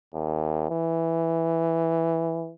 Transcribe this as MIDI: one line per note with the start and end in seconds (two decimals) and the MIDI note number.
0.14 0.69 39
0.70 2.52 52